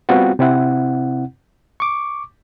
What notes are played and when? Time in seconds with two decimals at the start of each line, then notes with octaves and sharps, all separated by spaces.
0.09 G3 B3 C4 F4 F#4
0.39 C3 C4 E4 F#5
1.80 C#6 D6